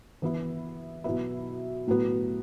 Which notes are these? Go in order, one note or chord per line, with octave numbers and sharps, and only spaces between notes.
E3 B3 E4
B2 F#3 B3 E4
A2 F#3 B3